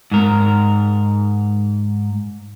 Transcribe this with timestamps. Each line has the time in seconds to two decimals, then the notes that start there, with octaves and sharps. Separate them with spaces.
0.12 G#2 A#4